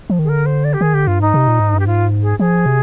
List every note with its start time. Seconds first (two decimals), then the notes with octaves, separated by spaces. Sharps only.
0.10 F3
0.19 D#3
0.24 G#4
0.28 D3 A#4
0.46 C5
0.64 D5
0.73 G4
0.81 D#3 G#4
0.94 D3 G4
1.07 G2 F4
1.21 G#2 D#4
1.34 C3
1.48 A#2
1.60 G#2
1.74 G2
1.79 G4
1.86 G#2 F4
2.22 G#4
2.39 F3 G#4
2.66 C3